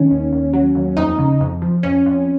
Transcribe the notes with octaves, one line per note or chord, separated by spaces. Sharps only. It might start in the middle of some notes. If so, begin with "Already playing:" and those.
Already playing: D#3 C#4
D#2
D#2
F#3
D#2
F2 D#4
C#3
F2
F3
F2 C#4
F2